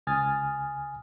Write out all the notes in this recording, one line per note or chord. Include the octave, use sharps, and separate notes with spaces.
C#2 G#5 D#6 F6 A6